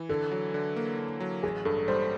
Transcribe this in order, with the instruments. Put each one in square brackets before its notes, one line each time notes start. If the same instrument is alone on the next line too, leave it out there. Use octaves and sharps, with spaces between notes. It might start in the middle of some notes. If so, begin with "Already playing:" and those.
Already playing: [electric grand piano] E3
[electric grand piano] D3 [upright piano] A4
[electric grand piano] F#3
D3
A#3
D3
F#3
[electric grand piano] A1 [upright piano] G#4
[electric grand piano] G2 [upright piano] A4
[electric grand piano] G3 [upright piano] C5